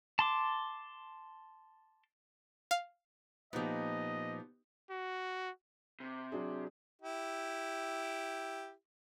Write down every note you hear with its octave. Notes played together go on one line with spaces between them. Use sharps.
A5 C6 D6
F5
A#2 F3 B3 D#4 G4 D#5
F#4
C3
F#3 D4 G#4
E4 G4